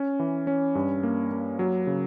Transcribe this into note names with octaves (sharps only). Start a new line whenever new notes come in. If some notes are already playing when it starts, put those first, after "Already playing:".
Already playing: C#4
E3
C#4
G2
A#3
A#3
F#3
C#3